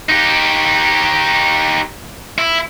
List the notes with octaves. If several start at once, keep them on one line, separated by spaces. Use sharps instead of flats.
D#4 G4
E4